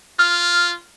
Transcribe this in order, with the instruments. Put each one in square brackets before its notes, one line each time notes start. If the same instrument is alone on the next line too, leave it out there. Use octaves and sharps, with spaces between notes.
[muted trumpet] F4 [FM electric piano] F6